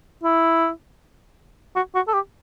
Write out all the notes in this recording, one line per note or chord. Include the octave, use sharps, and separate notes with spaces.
E4
F#4
F#4
A4
G4